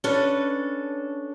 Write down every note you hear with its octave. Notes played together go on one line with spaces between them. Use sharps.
C#4 D4 A4 B4